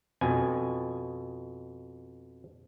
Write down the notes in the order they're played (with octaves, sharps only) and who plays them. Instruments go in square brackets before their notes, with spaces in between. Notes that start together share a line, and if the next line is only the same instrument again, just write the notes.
[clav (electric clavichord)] F2 B2 G#5